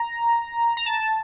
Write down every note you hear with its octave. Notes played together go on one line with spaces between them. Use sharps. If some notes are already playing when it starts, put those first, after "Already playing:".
Already playing: A#5
A#5
A5